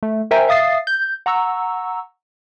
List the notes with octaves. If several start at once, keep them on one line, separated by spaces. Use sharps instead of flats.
A3
A#4 C5 E5 G5 G#5 A#5
E5 F5 D#6 A6 C7
G6
F#5 A#5 C#6 E6